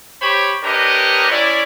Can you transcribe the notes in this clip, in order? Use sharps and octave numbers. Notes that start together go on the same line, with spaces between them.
G4 C5 C#5 G5 B5 C#6
D4 G4 A#4 B4 C#5 D#5
C#4 E4 C#5 D5